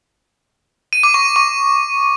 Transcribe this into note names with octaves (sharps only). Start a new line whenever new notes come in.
D#7
D6
C#6
D#7
C#6